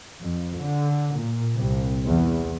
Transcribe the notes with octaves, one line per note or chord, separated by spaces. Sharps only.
F2
D3
A#2
C2
E2